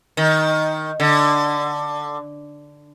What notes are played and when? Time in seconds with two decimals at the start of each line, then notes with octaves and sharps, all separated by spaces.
0.17 D#3
1.00 D3